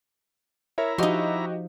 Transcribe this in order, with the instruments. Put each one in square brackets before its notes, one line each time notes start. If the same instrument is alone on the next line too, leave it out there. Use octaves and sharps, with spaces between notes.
[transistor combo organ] E4 A#5 [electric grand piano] A#4 C#5 E5
[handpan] F3 F5 [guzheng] D#4 C6 [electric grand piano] F#4 G4 D#5